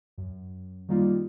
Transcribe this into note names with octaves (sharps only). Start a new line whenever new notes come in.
F#2
D#3 G3 A#3 D#4 F4